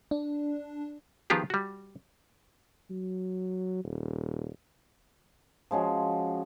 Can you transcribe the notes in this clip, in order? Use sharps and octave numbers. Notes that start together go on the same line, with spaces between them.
D4
D#3 F3 B3 F4 G4 G#4
G3 F#4
F#3
D#1
F3 G#3 C#4 F#4